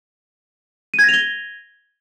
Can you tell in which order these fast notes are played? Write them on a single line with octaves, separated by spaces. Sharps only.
D#7 G#6 A#6 F7 G7